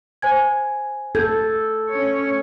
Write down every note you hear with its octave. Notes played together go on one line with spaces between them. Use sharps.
C5 G#5 G#6
A4 G6 G#6
C#4 C#5